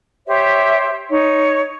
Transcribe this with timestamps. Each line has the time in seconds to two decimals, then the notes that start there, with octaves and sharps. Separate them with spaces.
0.26 G4 C5 C#5 E5
1.10 D#4 C#5